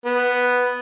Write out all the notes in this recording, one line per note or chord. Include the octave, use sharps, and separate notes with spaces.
B3